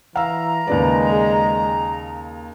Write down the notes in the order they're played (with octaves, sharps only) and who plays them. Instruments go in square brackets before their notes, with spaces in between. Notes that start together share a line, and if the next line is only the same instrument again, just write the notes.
[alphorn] E3 [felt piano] F5 E6 [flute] A#5
[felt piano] D#2 C#3 D5 [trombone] G#3 [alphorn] B4
[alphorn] G#4